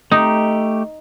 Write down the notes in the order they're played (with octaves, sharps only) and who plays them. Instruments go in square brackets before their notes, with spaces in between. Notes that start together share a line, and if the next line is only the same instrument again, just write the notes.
[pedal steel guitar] A3 G4 [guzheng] D#4